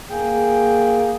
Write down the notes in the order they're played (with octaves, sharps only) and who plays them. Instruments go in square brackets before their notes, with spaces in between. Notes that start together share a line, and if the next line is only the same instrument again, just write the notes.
[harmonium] A#3 G#4 G5